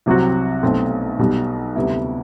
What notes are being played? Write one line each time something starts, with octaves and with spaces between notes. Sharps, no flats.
C2 C3 F#3 C4 F#4
B1 B2 A3 C4
B1 B2 G3
D2 C3 G3 B3 E4